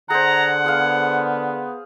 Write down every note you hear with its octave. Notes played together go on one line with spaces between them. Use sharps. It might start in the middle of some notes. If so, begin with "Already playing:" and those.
D3 G#4 C5 F#5 A#5
B3 G#4 F5